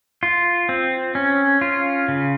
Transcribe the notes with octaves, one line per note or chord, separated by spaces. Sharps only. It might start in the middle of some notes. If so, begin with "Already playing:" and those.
F4
C4
C#4
F4
C#3